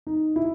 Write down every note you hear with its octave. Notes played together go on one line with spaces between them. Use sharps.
D#4
E4